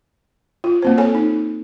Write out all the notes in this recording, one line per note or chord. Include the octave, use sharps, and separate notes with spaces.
F4
A#3 C4 C5
A4 C#5 G#5
D#4